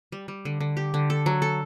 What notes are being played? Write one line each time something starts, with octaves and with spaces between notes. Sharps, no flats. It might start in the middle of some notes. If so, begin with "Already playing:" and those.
G3
G3
D3
D3
G4
D3
A4
F#3
A4